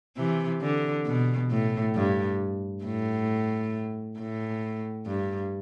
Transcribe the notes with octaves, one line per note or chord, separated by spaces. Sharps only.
C3 E3
D3
B2
A2
G2
A2
A2
G2